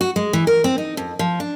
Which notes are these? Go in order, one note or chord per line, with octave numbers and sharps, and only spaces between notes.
F#4
G#3
E3
A#4
C4
D#4
F2
F3
D4